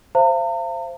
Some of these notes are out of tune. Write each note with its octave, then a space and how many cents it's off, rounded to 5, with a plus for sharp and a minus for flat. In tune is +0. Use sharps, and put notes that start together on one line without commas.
C5 +0 F5 -45 A#5 -45